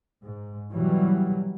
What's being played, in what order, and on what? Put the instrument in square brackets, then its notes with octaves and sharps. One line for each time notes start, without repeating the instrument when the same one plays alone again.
[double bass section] G#2
B2 E3 F#3 G3